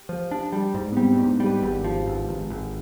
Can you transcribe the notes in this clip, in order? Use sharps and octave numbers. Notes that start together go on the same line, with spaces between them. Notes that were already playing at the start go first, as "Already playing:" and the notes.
Already playing: G4
F3
D4
G3
G#2
B3
G3 C4
D4
G#2
D#4
G3
B4
G#1 G4
F3
G#1
G#1
G#1